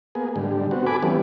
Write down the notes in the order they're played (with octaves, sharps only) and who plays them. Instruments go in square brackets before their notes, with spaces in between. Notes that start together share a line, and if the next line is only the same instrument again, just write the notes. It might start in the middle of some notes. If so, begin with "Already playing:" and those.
[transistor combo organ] A#3 B3 G#4
G#2 D3 G3
B3 C4 F#4
A4 G#5 B5 D6
E3 G3 B3 C#4